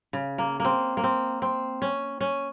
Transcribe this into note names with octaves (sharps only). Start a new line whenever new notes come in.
C#3
A#3
A#3 C4
A#3
C4
C4
C#4
C#4